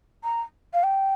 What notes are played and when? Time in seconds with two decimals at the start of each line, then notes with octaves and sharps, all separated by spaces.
0.24 A#5
0.74 F5
0.83 G5